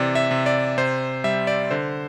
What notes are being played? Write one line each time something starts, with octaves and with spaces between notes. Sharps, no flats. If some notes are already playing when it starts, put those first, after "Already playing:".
Already playing: C3 E3 D5
E5
C3
D5
C3 C5
G3 E5
D5
D3 C5